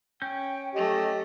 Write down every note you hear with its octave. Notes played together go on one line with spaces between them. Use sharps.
C#4 G5 G6
F#3 A3 G4 D#5